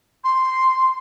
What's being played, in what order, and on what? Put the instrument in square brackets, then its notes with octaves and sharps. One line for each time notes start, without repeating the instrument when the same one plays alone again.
[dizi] C6